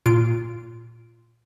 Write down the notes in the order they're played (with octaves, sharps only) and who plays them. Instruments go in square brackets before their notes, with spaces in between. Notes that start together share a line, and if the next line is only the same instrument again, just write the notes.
[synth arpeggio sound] A#2 F4 D7